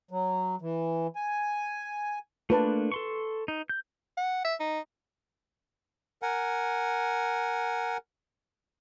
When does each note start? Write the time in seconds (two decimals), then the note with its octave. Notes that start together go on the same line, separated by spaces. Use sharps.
0.11 F#3
0.61 E3
1.16 G#5
2.50 A3 A#3 D4 F4 B4 A5
2.92 A4 C6 C#6
3.48 D#4
3.69 G6
4.17 F#5
4.45 E5
4.60 D#4
6.22 A#4 F#5 G#5